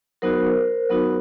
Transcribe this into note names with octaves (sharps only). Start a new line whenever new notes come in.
F#3 B3 D#4 F#4 A#4 C5
F#3 B3 D#4 F#4